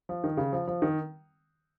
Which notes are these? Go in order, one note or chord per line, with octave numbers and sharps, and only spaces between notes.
F3
D#3
C#3
F3
F3
D#3